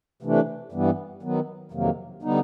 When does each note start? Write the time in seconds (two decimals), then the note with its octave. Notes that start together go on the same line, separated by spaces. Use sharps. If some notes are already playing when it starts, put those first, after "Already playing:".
0.23 C3 E3 A3 D4
0.72 G2 E3 G3 B3
1.23 D#3 F#3 B3
1.72 F2 C3 D#3 F#3 A#3
2.22 D3 G3 B3 D#4